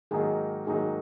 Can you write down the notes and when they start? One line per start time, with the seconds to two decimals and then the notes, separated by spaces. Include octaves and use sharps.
0.11 G#2 D#3 F#3 A#3 D#4 G#4
0.67 G#2 D#3 F#3 A#3 D#4 G#4